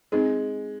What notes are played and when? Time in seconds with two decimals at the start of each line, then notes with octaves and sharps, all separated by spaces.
0.12 G#3 C4 D#4 G#4